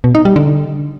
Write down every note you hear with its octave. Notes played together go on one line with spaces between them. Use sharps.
B2
D#4
G3
D3